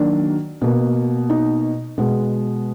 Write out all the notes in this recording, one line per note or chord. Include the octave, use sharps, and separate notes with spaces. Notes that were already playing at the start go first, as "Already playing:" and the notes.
Already playing: D#3 F#3 A#3 D4
B2 A#3
D#4
B2 G#3 B3